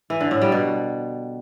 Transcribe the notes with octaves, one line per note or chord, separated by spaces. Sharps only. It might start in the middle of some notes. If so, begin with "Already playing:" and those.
E3
D3
A2
G3
B2